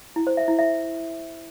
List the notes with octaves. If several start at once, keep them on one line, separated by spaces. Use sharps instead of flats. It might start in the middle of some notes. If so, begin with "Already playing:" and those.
E4
C5
E5
E4
E5